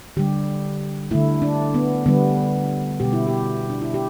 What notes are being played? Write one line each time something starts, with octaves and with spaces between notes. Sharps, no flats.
D3 G3 G4
D3 A3 E4
D4
B3
D3 G3 B3
B2 G3 G4
E4
G4
D4
E4
G4